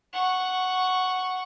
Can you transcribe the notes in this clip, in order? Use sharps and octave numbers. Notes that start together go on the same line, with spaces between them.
F#5 C#6